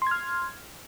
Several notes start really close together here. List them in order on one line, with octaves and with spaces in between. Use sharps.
C6 G#6 F6